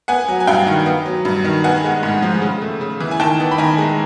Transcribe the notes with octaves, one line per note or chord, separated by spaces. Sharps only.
B3 F#5 G#5
F#3
G#5
G2 F5 G5
D#3
B3
F#3
G2
D#3
B3 F#5 G#5
G#3
G#2
F3
C#3
A3
C#3
E3
G#5
D#3 G5 A5
B3
B5
D#3 G#5 A#5
G#3